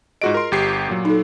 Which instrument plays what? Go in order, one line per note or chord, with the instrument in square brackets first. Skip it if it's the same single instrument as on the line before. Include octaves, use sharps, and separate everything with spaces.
[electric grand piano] G#2 F#4 D7 [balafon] F4 G#4 D#5
[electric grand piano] A#4 C6
G1 G4 C7
A#2 F#3
[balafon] D#4 A4